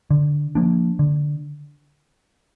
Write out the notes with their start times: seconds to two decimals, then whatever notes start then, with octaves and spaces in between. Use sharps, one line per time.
0.10 D3
0.55 F3 A#3 D4
0.99 D3